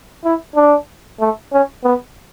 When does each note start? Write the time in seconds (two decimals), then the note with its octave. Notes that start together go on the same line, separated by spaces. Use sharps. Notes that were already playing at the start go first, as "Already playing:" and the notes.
0.24 E4
0.56 D4
1.20 A3
1.52 C#4
1.84 B3